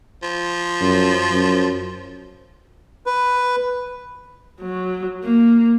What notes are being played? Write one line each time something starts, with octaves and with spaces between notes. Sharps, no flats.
F3
F#2
F#2
B4
F#3
A#3